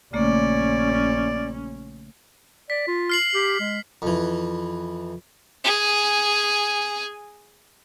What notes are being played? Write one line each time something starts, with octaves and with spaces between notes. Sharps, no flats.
A#1 C#3 A3 A#3 C#4 D5
D5 B6
F4
F6 C7 F#7
G4
G#3
F2 E3
G#4 G#5